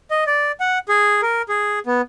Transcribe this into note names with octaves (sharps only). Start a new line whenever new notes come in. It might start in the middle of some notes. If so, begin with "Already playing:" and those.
D#5
D5
F#5
G#4
A#4
G#4
B3